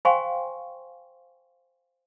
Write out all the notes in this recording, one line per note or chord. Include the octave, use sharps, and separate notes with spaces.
C5 F5 G5 G#5 C6 C#6